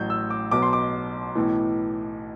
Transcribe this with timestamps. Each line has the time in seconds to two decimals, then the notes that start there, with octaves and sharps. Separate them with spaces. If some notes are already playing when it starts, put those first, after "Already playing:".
Already playing: A1 A2 F#3 G6
0.10 E6
0.30 D6
0.51 B1 B2 F#3 D6
0.62 C6
0.73 D6
1.36 B1 A2 E3